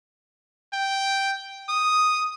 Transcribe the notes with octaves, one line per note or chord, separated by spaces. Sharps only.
G5
D#6